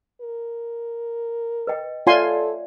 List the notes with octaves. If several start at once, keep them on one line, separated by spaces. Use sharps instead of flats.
A#4
B4 D#5 G5
F4 A4 C#5 D5 E5 G#5 C6